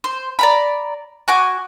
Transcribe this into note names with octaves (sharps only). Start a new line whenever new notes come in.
C5
D5 A#5 B5
F#4 G#5 D6